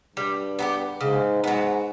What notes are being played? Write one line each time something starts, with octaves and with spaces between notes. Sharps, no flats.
G2 G3
B3 D4 G4
G#2 C#3
G#2 F#3 B3